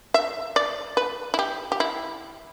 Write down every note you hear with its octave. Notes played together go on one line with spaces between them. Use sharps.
E5
D5
B4
E4
G4
G4
E4